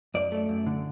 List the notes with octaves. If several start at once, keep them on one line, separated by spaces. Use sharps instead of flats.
F#2 D5
A3
F#2
D3